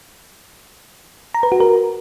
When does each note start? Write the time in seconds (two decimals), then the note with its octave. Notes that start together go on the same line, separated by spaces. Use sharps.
1.35 A#5
1.43 B4
1.52 F#4
1.60 A#4